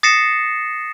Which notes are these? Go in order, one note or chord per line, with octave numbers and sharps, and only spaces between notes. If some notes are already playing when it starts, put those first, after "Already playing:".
D#6 A6 A#6 C7 C#7 E7